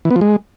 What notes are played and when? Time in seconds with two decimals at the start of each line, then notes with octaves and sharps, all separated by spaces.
0.05 E3
0.10 B3
0.16 F3
0.21 G#3